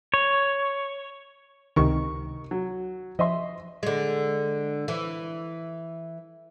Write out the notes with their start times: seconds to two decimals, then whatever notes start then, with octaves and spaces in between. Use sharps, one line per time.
0.14 C#5
1.76 C#2 C3 D#3 D#4 C#6
2.51 F#3
3.19 F3 D#5 E5 C6
3.83 D3 G#3
4.88 E3